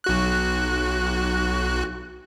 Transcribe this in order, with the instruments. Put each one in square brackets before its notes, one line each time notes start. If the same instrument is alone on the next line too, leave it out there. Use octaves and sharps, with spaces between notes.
[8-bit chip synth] B1 F#4 F#6